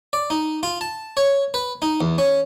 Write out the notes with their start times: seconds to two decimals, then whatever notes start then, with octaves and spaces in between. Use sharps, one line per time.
0.13 D5
0.30 D#4
0.63 F4
0.81 A5
1.17 C#5
1.54 B4
1.82 D#4
2.01 E2
2.18 C#4